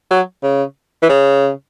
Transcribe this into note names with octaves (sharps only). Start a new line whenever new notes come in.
F#3
C#3
E3
C#3